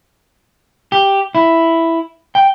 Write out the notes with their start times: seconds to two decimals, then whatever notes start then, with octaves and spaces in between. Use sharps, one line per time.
0.92 G4
1.35 E4
2.35 G5